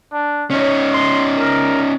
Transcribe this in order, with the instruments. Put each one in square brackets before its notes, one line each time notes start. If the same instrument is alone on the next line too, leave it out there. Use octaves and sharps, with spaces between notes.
[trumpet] D4
[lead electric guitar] C#4 D#4 [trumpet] C#5
[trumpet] C6
A#4